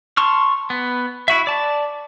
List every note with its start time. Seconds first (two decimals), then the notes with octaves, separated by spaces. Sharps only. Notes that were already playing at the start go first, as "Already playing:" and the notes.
0.17 A5 C6 C#6 F6
0.70 B3
1.28 E4 F#4 E5
1.47 D5 A5